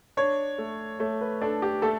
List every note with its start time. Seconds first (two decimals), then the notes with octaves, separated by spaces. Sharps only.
0.17 D4 C#5
0.58 A3
0.99 A3 C#5
1.21 B4
1.41 D4 A4
1.62 G4
1.82 A3 A4